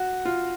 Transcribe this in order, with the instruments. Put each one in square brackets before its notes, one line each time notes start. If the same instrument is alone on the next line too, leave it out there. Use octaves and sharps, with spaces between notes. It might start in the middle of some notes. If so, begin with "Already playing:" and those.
Already playing: [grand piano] F#4
F4